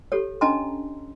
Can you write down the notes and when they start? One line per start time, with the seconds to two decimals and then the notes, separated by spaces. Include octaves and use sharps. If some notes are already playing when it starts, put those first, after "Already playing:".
0.12 G4 A4 C#5
0.41 C#4 D4 D#5 A5 A#5 C6